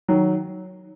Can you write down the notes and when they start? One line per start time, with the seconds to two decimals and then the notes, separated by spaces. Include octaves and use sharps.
0.09 D#3 F#3